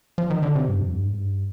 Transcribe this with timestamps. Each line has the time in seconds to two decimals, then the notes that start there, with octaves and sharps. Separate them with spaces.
0.18 F3
0.30 D#3
0.42 D3
0.55 C3
0.68 G2
0.80 F2
0.93 G2
1.06 G#2
1.18 G2